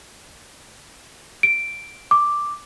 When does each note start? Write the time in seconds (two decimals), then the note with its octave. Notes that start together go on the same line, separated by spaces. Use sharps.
1.43 D7
2.11 D6